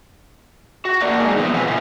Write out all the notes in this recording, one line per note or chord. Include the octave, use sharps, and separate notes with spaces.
F#4
A#3 A4 A#4 D5 F#5
G#3 A3 C4 D#4 G#4
B2 E3 F3 B3 C4
C3 F3 F#4 A4 B4 G#5
A#2 C#3 F3 C#4 E4